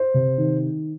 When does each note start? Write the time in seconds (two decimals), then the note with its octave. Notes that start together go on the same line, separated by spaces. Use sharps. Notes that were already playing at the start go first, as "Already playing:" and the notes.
Already playing: C5
0.14 C3
0.38 D#3